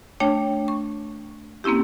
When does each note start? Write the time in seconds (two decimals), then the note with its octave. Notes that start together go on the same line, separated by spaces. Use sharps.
0.20 A3 D4 C#5 G5
0.68 C#6
1.64 A#3 C4 C#4 E4 G4